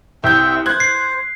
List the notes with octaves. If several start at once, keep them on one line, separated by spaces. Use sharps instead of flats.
C2 C4 E5 G5 G6
C5 F#6 G#6
C7